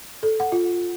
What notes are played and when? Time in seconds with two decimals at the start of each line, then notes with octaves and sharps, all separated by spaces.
0.23 A4
0.40 F#5
0.52 F4